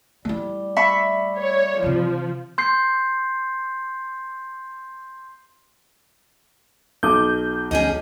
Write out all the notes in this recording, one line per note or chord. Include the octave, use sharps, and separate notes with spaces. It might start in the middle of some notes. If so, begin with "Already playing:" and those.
G3 A3 E4
E5 B5 C#6
C#5
C3 E3 F3
C6 G6 C7
B1 D6 D#6 G6
D2 C#4 G#4 D#5